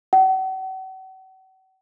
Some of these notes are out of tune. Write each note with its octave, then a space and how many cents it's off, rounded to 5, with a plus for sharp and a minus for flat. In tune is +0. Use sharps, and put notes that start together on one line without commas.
F#5 +40